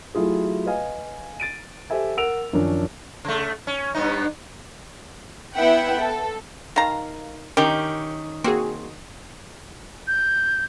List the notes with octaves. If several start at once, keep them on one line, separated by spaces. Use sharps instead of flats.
F#3 A3 E4 F4 G#4
B4 D#5 F5 G#5
A6 D7 D#7
G4 A4 C5 E5 G#5
A#4 F#5 E6 D7 F7
F#2 D#3 F3 C#4 D4
C#3 A3
C#4
G2 B3 D#4
B3 E4 E5 F#5 G5
A4
D#3 F5 A#5
D#3 C#4 G4 A#4
A#3 C4 F#4 G#4
G6